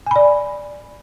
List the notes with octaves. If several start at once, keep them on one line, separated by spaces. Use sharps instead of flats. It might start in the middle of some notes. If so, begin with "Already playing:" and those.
D5 G#5 B5